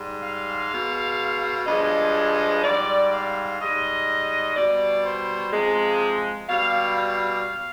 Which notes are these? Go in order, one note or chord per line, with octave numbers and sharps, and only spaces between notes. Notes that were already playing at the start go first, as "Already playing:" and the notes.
Already playing: G#2 G3
F5
B2 G#3
G2 F3 G#3 D#5
G#2 G3 D5
F5
G#2 G3 D#5
B2 G3 D5
C5
C3 F3 G#3
B2 G3 F5
F5